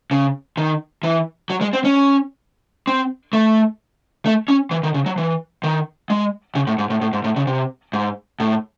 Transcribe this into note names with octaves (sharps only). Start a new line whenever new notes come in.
C#3
D#3
E3
F#3
G#3
C4
C#4
C4
A3
A3
C#4
E3
D#3
C#3
F#3
E3
D#3
G#3
C#3
A2
G#2
A2
A2
G#2
A2
C#3
C3
G#2
A2